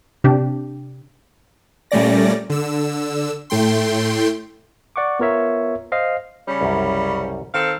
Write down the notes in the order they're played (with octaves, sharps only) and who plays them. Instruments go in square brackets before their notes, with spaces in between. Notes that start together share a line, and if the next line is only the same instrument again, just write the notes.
[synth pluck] C3 D4 G4
[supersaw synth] A#2 G3 A3 C#4 D5 A#6
D3 E6
A2 A3 G5 C6
[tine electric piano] D5 F#5 C#6 D6
B3 F4 A#4 C#5 E5
C5 D#5 F5
[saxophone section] C#3 G3 C#4
[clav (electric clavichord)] C2 F#2
[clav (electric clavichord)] D#3 [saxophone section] C4 A4 F5